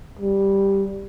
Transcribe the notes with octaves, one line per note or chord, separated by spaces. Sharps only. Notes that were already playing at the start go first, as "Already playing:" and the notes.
G3